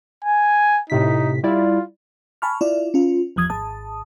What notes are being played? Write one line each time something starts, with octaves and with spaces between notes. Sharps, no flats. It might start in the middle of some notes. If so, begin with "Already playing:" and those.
G#5
A2 C3 D#4 B6
G3 E4 F4 D5
G#5 A5 B5 C#6 F6
E4 F4 D5
C#4 F4
G1 E2 F3 D#6 G#6
G#1 A5 D#6